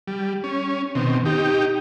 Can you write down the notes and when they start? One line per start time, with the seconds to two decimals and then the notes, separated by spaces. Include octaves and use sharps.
0.08 G3
0.44 C#4
0.95 B2 D#3 C4
1.25 D#4 G4